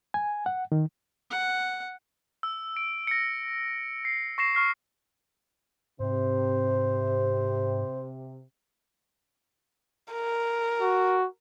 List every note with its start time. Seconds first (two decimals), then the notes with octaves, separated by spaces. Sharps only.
0.14 G#5
0.46 F#5
0.72 D#3
1.30 F#5
2.43 E6
2.77 D7
3.07 A#6 C#7
4.05 C7
4.38 C#6 A#6 C7 E7
4.55 C#6 F6 C7
6.00 G#2 C3 C5
10.13 A#4
10.81 F#4